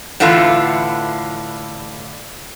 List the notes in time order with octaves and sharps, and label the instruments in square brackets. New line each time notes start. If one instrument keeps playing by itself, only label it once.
[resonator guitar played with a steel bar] A2 D3 E3 F4 A4 E5